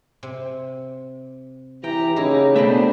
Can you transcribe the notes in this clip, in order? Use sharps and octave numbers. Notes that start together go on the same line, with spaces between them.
C3
E3 G4 G5 A#5
C#3 A#3 D#4 E4 G4
B2 A3 D4 B4 C5 G5 B5